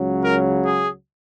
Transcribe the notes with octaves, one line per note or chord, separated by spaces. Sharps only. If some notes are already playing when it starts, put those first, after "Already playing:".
Already playing: C#2 C#3 F#3
A#4
G#4